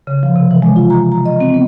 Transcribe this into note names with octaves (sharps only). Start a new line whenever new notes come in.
C#3
F3
C3
E3
G#3
F4
A#5
A#5
D#5
C4
B3